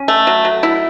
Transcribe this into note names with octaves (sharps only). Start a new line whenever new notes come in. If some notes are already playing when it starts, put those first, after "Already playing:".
Already playing: C#4
A3
F#3
F#3
E4